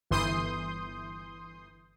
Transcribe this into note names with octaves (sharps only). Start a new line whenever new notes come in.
G1 E3 C6 D#6 G6